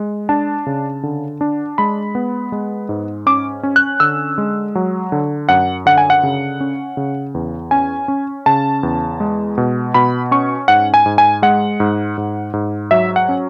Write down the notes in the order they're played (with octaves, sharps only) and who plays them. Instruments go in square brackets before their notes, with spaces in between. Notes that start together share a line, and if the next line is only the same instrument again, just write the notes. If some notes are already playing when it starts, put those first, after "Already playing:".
Already playing: [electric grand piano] G#3
D4 A5
C#3
D3
D4
G#3 B5
B3
G#3
G#2
C#4 D6
C#4
F#6
D3 E6
G#3
F#3
D3
F#2 F#5
D3 F#5
G#5
F#5
C#3
C#4
C#3
E2
C#4 G#5
C#4
C#3 A5
E2
G#3
B2
B2 B5
C#4 C#6
G#2 F#5
G#5
G#2
G#5
G#3 F#5
G#2
G#2
G#2
F#3 E5
F#5
C#4